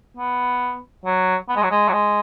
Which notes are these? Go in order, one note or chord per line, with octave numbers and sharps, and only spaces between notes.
B3
F#3
B3
G#3
F#3
G#3
F#3
G#3